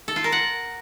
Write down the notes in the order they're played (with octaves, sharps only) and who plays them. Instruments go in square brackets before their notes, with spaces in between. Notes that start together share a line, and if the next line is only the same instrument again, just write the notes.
[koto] A4
F4
A#4
F#5